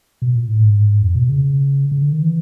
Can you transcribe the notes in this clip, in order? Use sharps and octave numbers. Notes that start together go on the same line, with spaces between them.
B2
A#2
A2
G#2
F2
B2
C#3
C#3
D3
D#3
E3